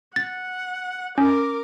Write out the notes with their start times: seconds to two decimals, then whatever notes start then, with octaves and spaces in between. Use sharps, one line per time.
0.16 F#5 A6
1.18 C#4 A#4 D6